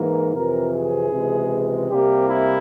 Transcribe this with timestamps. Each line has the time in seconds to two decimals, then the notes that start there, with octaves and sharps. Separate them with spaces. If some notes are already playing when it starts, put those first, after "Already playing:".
Already playing: G#2 E3 A#3 A#4
0.32 F2 C3 E3 A#4
0.72 G#4
1.11 C#2 C3 E3 G#3
1.90 C2 C3 G3 A#3 G4
2.29 E4